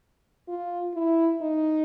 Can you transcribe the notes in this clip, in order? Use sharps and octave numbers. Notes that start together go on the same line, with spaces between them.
F4
E4
D#4